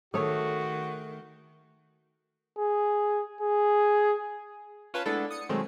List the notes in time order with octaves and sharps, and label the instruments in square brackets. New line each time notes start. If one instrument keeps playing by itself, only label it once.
[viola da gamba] D#3 [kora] A3 C#5 [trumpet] F#4 [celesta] G#4 A4 D#6
[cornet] G#4
G#4
[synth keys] C#4 F4 B4 C#5 A5
G#3 A3 B3 D4 E4 A4
D#6 C#7
B2 D#3 F#3 G#3 A3 C4